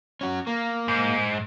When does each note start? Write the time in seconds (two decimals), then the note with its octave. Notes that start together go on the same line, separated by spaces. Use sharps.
0.21 C#4 F#4
0.47 A#3
0.88 G#2